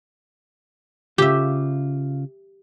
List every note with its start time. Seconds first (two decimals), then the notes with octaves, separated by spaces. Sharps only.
1.18 C#3 F4 G4 E5